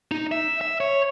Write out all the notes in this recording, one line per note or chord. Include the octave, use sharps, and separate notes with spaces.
D#4
E5
E5
C#5